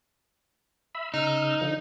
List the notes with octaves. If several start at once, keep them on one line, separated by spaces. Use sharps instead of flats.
E5 B5
C#3 D#4 E6 F6
D3 F3